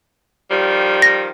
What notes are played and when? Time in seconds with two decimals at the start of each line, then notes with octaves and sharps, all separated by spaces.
0.51 D#3 F3 G3
1.02 A#6